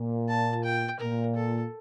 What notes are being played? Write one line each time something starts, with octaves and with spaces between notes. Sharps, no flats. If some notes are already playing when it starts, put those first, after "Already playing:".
Already playing: A#2
A5
G5
A#2 A#4
A4